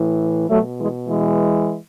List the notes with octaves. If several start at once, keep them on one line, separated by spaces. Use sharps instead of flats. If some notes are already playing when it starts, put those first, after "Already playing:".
Already playing: A2 E3
B2 F#3 A3
E3 G#3
E3 G#3